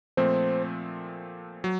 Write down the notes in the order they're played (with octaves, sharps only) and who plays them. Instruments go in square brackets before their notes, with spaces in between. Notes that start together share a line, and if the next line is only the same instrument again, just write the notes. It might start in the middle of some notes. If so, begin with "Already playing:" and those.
[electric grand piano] A#2 F3 A3 C4 [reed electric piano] C5
[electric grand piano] F#3